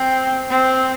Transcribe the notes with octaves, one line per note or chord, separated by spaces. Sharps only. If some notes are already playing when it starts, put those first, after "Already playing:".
Already playing: C4
C4